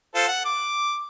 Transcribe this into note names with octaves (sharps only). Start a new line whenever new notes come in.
F4 A4 C5
F#5
D6